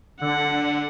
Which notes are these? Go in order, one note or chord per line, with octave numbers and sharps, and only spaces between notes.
D3 F#5